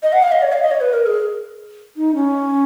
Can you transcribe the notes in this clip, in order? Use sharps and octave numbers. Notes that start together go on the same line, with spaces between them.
D#5
F#5
F5
D#5
C#5
F5
D#5
C#5
B4
A#4
G#4
D#4
C#4